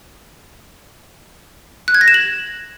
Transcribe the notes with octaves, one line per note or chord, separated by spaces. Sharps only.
F#6
G#6
A#6
E7
F#7